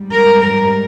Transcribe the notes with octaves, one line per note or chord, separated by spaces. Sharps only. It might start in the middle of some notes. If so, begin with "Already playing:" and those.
Already playing: G#2 G3
A#4
A#4